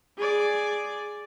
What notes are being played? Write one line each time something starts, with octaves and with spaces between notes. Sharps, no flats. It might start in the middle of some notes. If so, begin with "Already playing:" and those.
G#4 D5